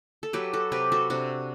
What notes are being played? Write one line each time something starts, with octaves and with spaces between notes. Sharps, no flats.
A4
F#3 G4 B4
F#4 A4
C3 G4 B4
F#4 A4
C3 D4 F#4